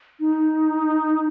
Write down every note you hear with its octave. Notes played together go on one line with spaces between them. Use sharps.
D#4